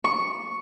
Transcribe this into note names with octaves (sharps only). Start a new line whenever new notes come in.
C#6